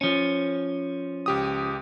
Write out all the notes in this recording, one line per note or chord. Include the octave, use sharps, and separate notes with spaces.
F3 C#4
C#2 G4 D#6